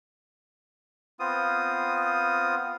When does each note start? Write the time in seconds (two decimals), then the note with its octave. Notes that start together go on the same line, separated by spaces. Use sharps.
1.20 B3 C4 F4 D#6